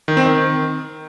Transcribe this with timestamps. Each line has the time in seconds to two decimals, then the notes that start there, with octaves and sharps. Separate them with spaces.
0.08 D#3
0.17 C4
0.26 D#3